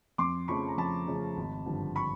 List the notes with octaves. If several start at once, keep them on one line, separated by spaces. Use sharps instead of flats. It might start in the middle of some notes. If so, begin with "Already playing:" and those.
F2 C6 D6
C#3 F3 A3 C#4 B5 C#6
A#5
F2 A5 B5
C#3 F3 A3 C#4
G#1
G2 D3 F3
B5 C#6